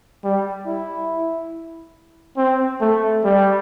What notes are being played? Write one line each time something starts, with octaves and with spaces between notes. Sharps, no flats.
G3
E4
C4
A3
G3